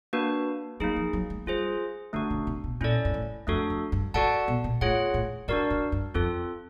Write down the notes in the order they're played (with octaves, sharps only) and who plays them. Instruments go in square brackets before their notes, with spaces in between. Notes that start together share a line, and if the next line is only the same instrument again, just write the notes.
[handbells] A#3 D4 F#4 B4
[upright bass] F#3 [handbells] A#3 D#4 G#4
[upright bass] F3
F#3
G#3
[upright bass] G3 [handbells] F4 G#4 C5
[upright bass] D3 [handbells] A3 D4 F#4
[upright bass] C#3
C3
B2
[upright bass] A#2 [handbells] C#4 E4 A4 D5
[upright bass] G#2
A2
[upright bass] F2 [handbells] A3 D4 F#4 A4
[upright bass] F2
G2
[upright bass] G#2 [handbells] F#4 A4 D5 F#5 A5
[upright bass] B2
A#2
[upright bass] A2 [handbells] F4 G#4 C#5 F#5
[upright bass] A2
[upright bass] G#2 [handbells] D4 F#4 A#4 D5
[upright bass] G#2
G2
[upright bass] F2 [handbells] C4 F4 A4